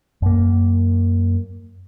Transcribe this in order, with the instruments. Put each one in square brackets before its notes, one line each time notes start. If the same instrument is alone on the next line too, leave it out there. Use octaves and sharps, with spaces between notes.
[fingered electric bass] F#2 A#3